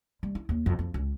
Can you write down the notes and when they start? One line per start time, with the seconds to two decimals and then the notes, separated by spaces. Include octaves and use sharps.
0.23 G3
0.35 E4
0.49 D#2
0.66 F2
0.79 F2
0.94 C#2